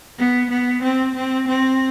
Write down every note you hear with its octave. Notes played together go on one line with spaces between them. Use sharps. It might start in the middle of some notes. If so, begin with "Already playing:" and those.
B3
B3
C4
C4
C4